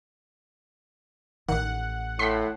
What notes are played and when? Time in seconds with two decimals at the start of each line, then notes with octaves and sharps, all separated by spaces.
1.48 A1 D#3 F#5
2.19 A2 C6 B6 C7